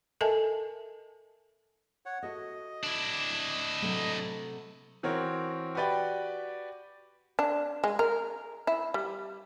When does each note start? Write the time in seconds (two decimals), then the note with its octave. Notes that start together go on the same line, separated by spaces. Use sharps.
0.21 A4 A#4 D#5 E5 G#5 A5
2.06 C#5 F#5
2.23 F#4 A4 D#5 E5
2.83 D4 E4
3.82 C3 F#3 A3
5.03 E3 C4 F#4 A#4 C#5
5.75 F#4 G4 B4 D5 G5
7.39 D4
7.84 G#3
7.99 A#4
8.67 E4
8.94 G3